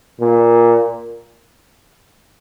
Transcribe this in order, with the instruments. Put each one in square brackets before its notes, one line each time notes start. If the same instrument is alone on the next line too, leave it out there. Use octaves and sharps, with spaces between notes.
[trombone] A#2